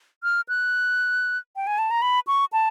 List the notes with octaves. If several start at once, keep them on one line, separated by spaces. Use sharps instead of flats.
F6
F#6
G5
G#5
A5
A#5
B5
C#6
A5